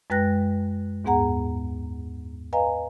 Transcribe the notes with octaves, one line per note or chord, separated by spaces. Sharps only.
F#2 G#3 B4 G5 F#6 A#6
D#2 G#2 B3 G#4 F#5 A#5
B4 D#5 F5 G#5 A#5